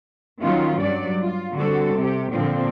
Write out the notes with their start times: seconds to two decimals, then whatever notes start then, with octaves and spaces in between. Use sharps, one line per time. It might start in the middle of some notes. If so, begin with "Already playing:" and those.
0.40 D#3 F#3 C#4 F4
0.81 G2 F#3 D5
1.22 F4
1.56 D3 G3 C4 F#4 A4
1.98 C3 G4
2.33 A#2 D3 F3 C4